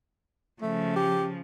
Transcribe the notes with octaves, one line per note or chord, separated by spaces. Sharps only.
C#3 F3 A3
G4